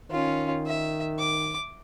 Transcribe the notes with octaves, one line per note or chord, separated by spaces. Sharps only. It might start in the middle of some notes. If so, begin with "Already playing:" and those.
D#3 C#4 F4
E5
D6